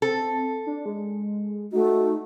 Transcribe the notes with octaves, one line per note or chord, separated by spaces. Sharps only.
C4 A4
D4
G#3
A3 D#4 F#4